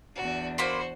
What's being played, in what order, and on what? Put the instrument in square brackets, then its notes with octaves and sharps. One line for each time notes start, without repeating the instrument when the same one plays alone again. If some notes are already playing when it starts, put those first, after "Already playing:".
[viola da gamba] E2 D4 [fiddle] F#4
[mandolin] A#3 B5 C6 [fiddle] F#4 C5